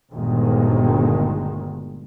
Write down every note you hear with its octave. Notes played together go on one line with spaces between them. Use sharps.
G1 D2 A#2 D#3 G#3